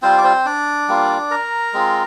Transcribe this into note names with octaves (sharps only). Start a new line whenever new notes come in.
G3 C4 F4 C5
D5
C4 C5
D4 D5
G3 A#3 F4
A#4 A#5
G#3 C4 F4